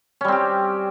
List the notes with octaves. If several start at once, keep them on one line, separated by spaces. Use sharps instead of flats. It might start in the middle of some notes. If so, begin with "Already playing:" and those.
G3 C4 C#4 G4